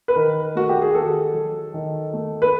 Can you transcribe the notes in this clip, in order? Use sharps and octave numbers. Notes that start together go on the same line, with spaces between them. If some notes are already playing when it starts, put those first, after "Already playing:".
B4
D#3 A#4
A3 F#4
G4
G#4
D#3 A4
F#3
D#3
A3
B4